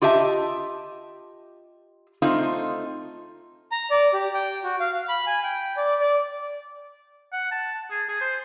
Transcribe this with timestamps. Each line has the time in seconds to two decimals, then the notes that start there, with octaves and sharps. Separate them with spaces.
0.02 F4 G4 D#5 E5 A5
2.22 A3 C4 D#4 F4
3.72 A#5
3.90 D5
4.13 G4
4.34 G5
4.64 F#4
4.80 F5
4.93 F5
5.09 B5
5.27 G#5
5.44 G5
5.77 D5
6.00 D5
7.33 F#5
7.52 A5
7.91 G#4
8.09 G#4
8.21 C5